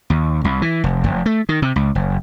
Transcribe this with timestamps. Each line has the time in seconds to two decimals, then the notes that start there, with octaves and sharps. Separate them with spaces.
0.10 D#2
0.44 C2
0.62 E3
0.84 F1
1.04 F1
1.26 A3
1.49 D#3
1.62 C3
1.76 C#2
1.95 F#1